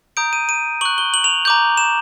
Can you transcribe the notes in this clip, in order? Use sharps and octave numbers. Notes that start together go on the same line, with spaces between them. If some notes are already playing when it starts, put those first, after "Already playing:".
A#5 D#6 G6 D7
D#7
D#7
C#6 F#6 F#7
G7
F#7
F7
A#5 D6 G6
E7